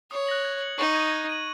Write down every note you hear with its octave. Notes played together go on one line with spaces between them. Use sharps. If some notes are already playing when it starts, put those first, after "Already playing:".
C#5 D#6
F#6 A#6 F#7
G#6
C#7 F#7
D#4 C#6
G#6 D#7
G#6
D#7 F#7